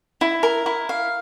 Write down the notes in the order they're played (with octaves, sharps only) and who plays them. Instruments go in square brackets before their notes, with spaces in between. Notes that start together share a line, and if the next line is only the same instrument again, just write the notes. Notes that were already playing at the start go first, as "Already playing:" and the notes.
[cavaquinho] E4
A#4
E4
F5